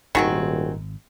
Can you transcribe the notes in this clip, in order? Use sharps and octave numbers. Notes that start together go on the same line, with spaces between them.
D#1 G#1 D#3 C4 F#4 G#4